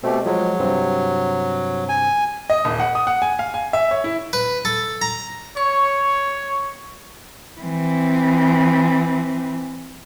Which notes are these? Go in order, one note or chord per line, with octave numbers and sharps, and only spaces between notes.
B2 A3 C4 G4
F3 F#3 G#3
G2 C3 C4
G#5
D#5
D#1
F#5
D#6
F#5
G#5
F5
G#5
E5
C#5
E4
B4
A4
A#5
C#5 C#6
E3 C4